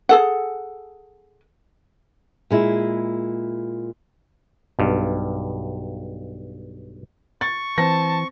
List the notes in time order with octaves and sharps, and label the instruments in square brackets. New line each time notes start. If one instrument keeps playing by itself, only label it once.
[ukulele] G#4 A4 F#5
[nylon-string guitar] A#2 G#3 E4
[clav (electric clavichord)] B1 G2
[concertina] C#6 [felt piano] A6
[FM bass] E3 [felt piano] C4 A#6 [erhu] A5